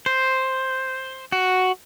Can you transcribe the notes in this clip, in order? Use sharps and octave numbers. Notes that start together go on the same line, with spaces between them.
C5
F#4